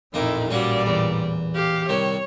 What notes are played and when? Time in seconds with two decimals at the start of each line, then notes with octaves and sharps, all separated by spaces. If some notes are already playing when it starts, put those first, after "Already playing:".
0.14 A1 F2 A#2 A#3 D#4 E4 D6
0.51 F#3 G3 A#3 C#4 D5
0.86 E2
1.54 G4 F5
1.89 C2 D#3 C#5